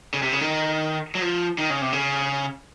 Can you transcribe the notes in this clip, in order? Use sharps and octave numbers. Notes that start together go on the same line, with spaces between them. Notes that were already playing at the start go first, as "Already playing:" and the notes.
C#3
C3
C#3
D#3
F#3
F3
D#3
C#3
C3
C#3